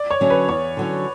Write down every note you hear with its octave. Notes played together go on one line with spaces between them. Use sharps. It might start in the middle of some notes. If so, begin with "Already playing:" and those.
Already playing: D5
C#5
D3 F#3 C#4
B4
E2 C#5
D3 F#3 C#4